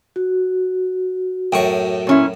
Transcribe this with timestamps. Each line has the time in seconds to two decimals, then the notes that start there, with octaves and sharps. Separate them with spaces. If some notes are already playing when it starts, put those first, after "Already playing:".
0.16 F#4
1.53 F#2 A2 G5 C#6
2.07 A#2 C#4 E4